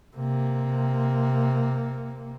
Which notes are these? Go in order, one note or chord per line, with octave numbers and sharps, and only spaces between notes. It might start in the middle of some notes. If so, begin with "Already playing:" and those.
C3 A#3